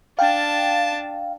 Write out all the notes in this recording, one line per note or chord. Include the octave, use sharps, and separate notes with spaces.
D4 F5 G5 A5